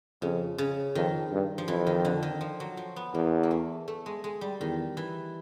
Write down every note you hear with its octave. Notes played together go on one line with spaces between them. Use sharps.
F2 C#3
C#3
F2 D#3
G2
F3
F2 E3
D#3
D3
D#3
F3
F#3
F3
B3
E2 A#3
A#3
A3
A3
G#3
G#3
G3
E2 D#3
E3